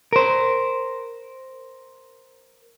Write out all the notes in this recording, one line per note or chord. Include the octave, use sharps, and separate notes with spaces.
A#4 C5